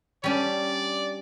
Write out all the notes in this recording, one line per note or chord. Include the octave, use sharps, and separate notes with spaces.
G3 C#4 D4 D5